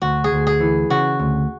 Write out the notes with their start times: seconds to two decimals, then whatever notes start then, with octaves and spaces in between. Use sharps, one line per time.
0.02 D2 F#4
0.24 G#4
0.32 D2
0.47 G#4
0.60 E3
0.90 C#3 F#4
1.20 D2